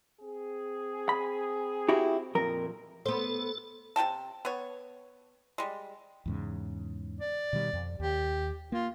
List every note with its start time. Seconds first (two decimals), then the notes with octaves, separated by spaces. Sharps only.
0.22 C4 G#4
1.09 B5
1.88 E4 F#4 G4
2.35 F2 A#2 A#4
3.06 B3 A4 C5
3.96 C3 F#4 G5 A5
4.45 B3 C#5
5.58 G3 G#3
6.26 E2 G#2 C#3
7.21 D5
7.53 B2 D#3 G3
7.73 F2
8.00 D#2 G4
8.72 A#3 F4